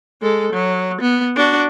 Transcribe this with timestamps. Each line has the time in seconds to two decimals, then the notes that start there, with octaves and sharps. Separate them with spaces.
0.21 G#3 A4
0.52 F#3
1.01 B3
1.36 D4 F#4